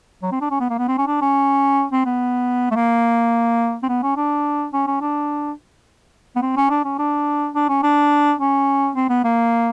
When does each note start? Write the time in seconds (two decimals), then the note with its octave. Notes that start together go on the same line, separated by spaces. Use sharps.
0.23 F#3
0.32 C4
0.41 D4
0.51 C#4
0.60 B3
0.70 A#3
0.78 B3
0.88 C4
0.98 C#4
1.07 D4
1.22 C#4
1.92 C4
2.06 B3
2.71 A3
2.76 A#3
3.83 C4
3.89 B3
4.03 C#4
4.17 D4
4.73 C#4
4.87 C#4
5.01 D4
6.36 B3
6.42 C4
6.57 C#4
6.70 D4
6.85 C#4
6.99 D4
7.55 D4
7.69 C#4
7.83 D4
8.39 C#4
8.96 C4
9.09 B3
9.24 A#3